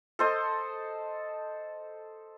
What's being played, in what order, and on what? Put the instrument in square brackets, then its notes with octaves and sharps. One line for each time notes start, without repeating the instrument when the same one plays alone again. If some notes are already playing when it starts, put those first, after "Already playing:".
[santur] A4 C5 D#5